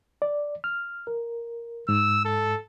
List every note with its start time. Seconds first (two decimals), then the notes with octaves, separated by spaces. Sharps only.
0.22 D5
0.64 F6
1.07 A#4
1.89 G#2 E6
2.25 A4